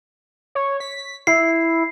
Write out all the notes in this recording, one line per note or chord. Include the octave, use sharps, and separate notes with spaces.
C#5
B6
E4 C7